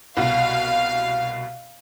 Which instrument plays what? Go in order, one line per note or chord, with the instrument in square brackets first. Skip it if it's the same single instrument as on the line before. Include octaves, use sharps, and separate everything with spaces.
[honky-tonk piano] C2 B2 [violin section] F5